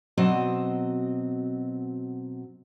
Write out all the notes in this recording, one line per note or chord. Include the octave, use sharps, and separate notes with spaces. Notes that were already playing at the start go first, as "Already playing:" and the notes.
B2 F#3 C4 D#5